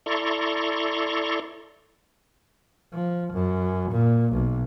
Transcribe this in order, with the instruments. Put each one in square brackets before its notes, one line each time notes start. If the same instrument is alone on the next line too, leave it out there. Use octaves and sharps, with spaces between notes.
[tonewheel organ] E4 A4 D5 A#5 C6 C#6
[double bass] F3
F#2
A#2
B1